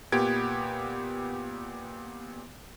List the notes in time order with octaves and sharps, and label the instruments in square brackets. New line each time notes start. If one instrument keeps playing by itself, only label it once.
[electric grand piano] A#2 B3 G4 G#6 D7